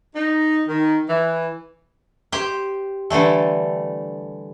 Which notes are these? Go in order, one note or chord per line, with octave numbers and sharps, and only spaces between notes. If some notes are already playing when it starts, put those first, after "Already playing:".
D#4
D#3
E3
G4 C5 G5
D3 E3 G3 A3